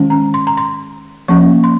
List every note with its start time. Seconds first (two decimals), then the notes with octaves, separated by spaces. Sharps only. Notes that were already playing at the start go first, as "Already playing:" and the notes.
Already playing: D#3 G#3 C#4
0.10 A#5
0.34 C6
0.47 A#5
0.57 C6
1.28 F3 A#3 C#4 C#6
1.64 C6